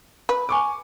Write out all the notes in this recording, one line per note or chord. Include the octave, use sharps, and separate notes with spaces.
B4
G#5 C#6 D6